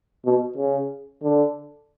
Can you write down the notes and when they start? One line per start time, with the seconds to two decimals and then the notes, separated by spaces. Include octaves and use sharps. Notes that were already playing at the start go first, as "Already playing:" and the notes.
0.25 B2
0.58 C#3
1.23 D3